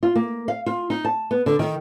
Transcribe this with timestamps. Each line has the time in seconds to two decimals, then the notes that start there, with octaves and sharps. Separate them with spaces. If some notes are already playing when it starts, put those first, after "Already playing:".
0.03 F4
0.15 A#3
0.48 F5
0.66 F4
0.90 D#4
1.05 A5
1.31 B3
1.46 D3
1.59 D#3